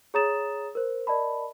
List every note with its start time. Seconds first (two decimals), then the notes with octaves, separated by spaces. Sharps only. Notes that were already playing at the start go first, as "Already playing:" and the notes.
0.14 G#4 C#5 A#5 D#6 A6 E7
0.75 A#4 C5
1.07 A#4 D5 D#5 A5 B5